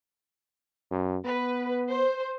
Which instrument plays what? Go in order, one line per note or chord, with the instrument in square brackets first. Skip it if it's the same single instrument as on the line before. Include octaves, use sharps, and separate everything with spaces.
[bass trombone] F#2
[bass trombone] B3 [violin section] B4
[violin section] C5